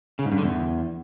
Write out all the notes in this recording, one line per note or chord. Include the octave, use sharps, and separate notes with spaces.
C#3
G#2
G2
D3
E2